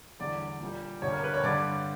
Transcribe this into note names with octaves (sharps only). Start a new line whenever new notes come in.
E2 D3 G3 D5
A#2 G3
G2 D3 G3 C#5
A#4
B4
C#5
G2 D3 G3 D5